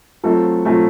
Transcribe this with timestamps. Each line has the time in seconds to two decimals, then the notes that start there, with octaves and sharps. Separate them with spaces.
0.24 F#3 A3 C4 F4 A4
0.65 F#3 A3 C4 F4 A4